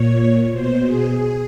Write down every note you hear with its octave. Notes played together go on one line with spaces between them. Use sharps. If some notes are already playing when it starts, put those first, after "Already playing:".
Already playing: A#2 C#5
B2 C5
G#4